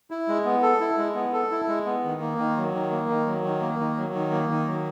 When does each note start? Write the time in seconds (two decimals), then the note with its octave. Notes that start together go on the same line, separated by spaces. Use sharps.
0.11 E4
0.28 G#3
0.45 B3
0.62 A4
0.81 E4
0.98 G#3
1.15 B3
1.33 A4
1.51 E4
1.68 G#3
1.86 B3
2.04 D#3
2.21 A#3
2.38 D#3
2.57 F#3
2.74 D#3
2.91 A#3
3.09 D#3
3.27 F#3
3.44 D#3
3.61 A#3
3.79 D#3
3.97 F#3
4.13 D#3
4.31 A#3
4.49 D#3
4.67 F#3